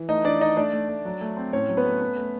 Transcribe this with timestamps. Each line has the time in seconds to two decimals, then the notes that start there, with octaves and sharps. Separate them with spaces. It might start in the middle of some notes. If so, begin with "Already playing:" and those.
Already playing: E3
0.09 A3 D#4 D#5
0.24 E3 D4 D5
0.41 D4 D#4 D#5
0.57 A3 D4 D5
0.73 A3
0.89 A3
1.05 F#3
1.21 A3
1.37 C4
1.53 A2 C#4 C#5
1.69 F#3
1.77 B3 B4
1.85 A3
2.01 C#4
2.17 A3